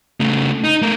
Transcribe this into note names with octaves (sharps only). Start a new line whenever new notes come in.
C#3 A3
D#4
A3 A#4